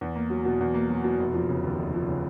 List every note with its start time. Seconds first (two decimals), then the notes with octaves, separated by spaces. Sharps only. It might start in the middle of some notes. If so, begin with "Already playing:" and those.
0.01 E2
0.16 A#3
0.30 F#3
0.45 B2
0.60 E2
0.74 A#3
0.89 F#3
1.04 B2
1.19 F1
1.34 F3
1.49 C#3
1.64 D#2
1.79 F1
1.94 F3
2.08 C#3